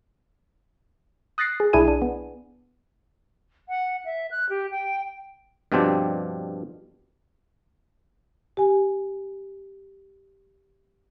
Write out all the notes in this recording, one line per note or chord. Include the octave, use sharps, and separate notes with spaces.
D#6 F#6 A6 A#6 C7 D7
G#4
B1 D4 E4 G#4 G#5 D#7
D4
B3
F#5
E5
F#6
G4
G5
G2 B2 F3 C4 D4 G4
G4 G#5